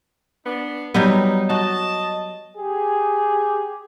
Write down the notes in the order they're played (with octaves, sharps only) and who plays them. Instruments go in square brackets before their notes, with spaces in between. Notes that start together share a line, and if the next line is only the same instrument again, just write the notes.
[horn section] B3 D4
[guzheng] F#3 G3 B3 [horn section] D#4 G4
[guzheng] F#4 [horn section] D#5 A5
[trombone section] G4 G#4